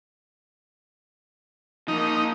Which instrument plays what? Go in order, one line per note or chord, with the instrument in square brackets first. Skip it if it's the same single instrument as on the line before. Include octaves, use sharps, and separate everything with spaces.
[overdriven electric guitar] F3 A#3 [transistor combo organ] D#4